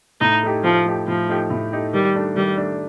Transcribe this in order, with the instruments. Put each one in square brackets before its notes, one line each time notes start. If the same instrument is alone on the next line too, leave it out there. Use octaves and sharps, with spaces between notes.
[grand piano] A2 [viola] D#4
[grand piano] A3 D#4 G4
[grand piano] A2 [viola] F3
[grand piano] A3 D#4 G4
[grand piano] A2 [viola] F3
[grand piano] A3 D#4 G4
A2
A3 D#4 G4
[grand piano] D#3 [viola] G3
[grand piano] A3 D4
[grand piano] D#3 [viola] G3
[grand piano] A3 D4